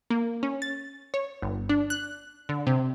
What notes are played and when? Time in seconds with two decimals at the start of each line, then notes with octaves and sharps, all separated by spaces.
0.10 A#3
0.43 C#4
0.62 A6
1.14 C#5
1.42 G1
1.69 D4
1.90 F#6
2.49 D3
2.67 C3